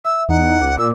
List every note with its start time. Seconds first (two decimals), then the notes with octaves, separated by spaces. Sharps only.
0.05 E5 E6
0.29 E2 D#4 D#5 F#5 A#5
0.61 C#2 D6
0.78 A#2 A#4 D5 D6 E6